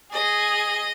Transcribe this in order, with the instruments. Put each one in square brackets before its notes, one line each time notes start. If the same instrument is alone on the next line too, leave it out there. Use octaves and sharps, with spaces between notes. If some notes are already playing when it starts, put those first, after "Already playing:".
[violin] G#4 [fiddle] D#5